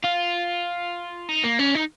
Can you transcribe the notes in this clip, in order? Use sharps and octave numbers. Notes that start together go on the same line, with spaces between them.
F4
D#4
A#3
C#4
D#4